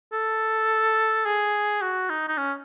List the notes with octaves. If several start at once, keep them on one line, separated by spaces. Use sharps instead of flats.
A4
G#4
F#4
D#4
D#4
C#4